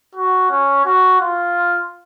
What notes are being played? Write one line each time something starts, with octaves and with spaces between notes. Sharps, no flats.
F#4
C#4
F#4
F4